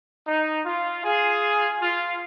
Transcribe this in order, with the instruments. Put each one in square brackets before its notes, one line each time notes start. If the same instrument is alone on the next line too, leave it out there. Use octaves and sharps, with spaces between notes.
[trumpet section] D#4
F4
F4 G#4
F4